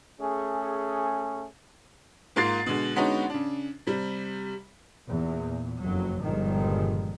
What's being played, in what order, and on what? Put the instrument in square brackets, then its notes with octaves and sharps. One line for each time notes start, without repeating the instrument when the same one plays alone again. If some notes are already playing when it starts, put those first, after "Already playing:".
[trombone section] A3 C#4 G#4
[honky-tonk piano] G#2 A#3 F4 C6 A6 C7
B2 D3 G#3
D3 G#3 B3 C#4 D#4 F#4
C#3 D4
C3 G3
[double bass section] E2 A#2
F#1 F2 F#3
G1 G2 A#2 D#3 F3 G#3